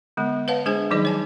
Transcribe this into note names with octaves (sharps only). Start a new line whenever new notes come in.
D3 G#3 B3
B4 C#5 F5 F#5 A5
G#3 D4 G#4 C5 G#5
D#3 F#3 G3 D#4 G#4 D#5
C#5 G#5 A5